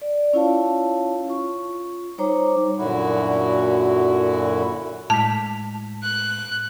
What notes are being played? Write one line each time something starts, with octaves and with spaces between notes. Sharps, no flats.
D5
C#4 E4 F4 C#5 F5 A5
F4 C#6
G3 D#4 C5 C#5 A#5 D6
F#2 A#2 D3 E4 F#4
A2 G#3 A5 B6
F#6